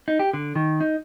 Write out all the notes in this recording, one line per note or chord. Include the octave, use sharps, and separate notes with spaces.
D#4
G4
D3
D#3
D#4